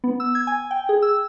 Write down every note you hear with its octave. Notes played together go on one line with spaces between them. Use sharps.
B3
E6
G#6
G#5
G5
G#4
E6